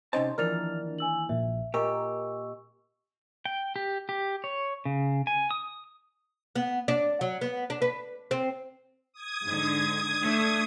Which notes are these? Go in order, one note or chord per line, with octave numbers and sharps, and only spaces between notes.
C3 C#4 D#4 C5 A5
D#2 E3 F3 D4 A#4 F6 A6 F7
G#5 E6 F#7
A#1 A#2 E5
A#2 G4 A#4 D#5 C#6 E6
G5
G4
G4
C#5
C#3
G#5
D#6
B3
D4
F#3
B3
D4
B4
C4
D#6 G#6
G#2 D3
A3 D4